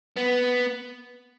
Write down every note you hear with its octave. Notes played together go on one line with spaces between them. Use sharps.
B3